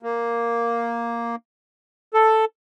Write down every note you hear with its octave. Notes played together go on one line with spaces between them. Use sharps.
A#3
A4